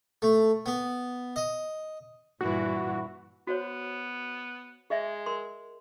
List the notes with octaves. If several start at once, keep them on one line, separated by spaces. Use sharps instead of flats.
A3
B3
D#5
G2 A#2 E3 F#4
B3 F#4 C5 C#5
G#3 G#4 D#5 E5
A#4 C6